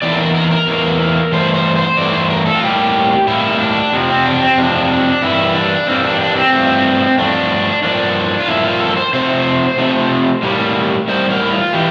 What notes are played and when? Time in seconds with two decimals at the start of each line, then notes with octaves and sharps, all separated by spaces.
0.02 E2 E3 A#3 D5
0.11 A4
0.19 A#4
0.34 A#4
0.51 A#4
0.67 E2 E3 A#3
1.32 G2 E3 A3 C5
1.54 C5
1.76 C5
1.97 G2 E3 A3 D5
2.14 C5
2.30 A#4
2.46 A4
2.55 F4
2.63 A2 G3 A#3 G4
3.27 A2 G3 A#3 E4
3.60 D4
3.93 F2 C3 F3
4.09 C4
4.26 D4
4.41 C4
4.58 F2 C3 F3 D4
5.22 G2 E3 G3 A#3 E4
5.55 D4
5.87 G2 E3 G3 A#3 C4
6.04 D4
6.21 D4
6.36 C4
6.53 G2 F3 A3
7.18 G2 F3 A3 D4
7.83 G2 F3 A#3 D4
8.40 F4
8.48 G2 F3 A#3 E4
8.64 F4
8.81 A4
8.97 C5
9.13 C3 F3 A3 C5
9.78 C3 F3 A3
10.43 A2 G3 A#3
11.08 A2 G3 A#3 C5
11.30 A#4
11.41 E4
11.52 F4
11.73 E3 G4